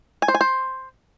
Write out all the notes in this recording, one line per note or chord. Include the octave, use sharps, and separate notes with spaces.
G#5
C5
G#5
C5